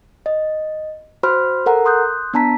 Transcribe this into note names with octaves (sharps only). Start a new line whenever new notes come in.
D#5
F#4 C5 B5 C6 F6
A4 A#4 F#5 A#5
C6 D#6 F#6 G6
B3 D4 A5 A#5 B6